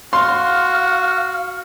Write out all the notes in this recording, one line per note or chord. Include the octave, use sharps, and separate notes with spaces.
F#4 F5 C6